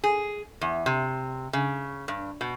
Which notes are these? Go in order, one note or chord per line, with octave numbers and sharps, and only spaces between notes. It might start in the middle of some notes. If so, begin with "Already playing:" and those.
G#4
E2
C3
C#3
G2
B2